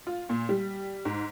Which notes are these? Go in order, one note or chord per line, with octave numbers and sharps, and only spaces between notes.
F4
A#2
G3
G#2